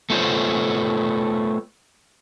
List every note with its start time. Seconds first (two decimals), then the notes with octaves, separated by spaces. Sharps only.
0.10 A3 B3 F4 C5 C#5